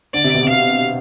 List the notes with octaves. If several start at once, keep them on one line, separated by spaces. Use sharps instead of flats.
D3 D5
C3
B2
C3 F5